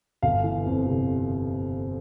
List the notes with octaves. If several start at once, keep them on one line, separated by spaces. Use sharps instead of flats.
G1 F5
E3
F2
C3